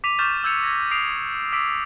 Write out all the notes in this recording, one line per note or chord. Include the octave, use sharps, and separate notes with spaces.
D6 B6 D#7 F7
C#6 D6 F6 G6 A6 E7
E6 G6 G#6 C#7 F7
G#6 A#6
D#6 C7 D7 F7
D6 E6 B6 D7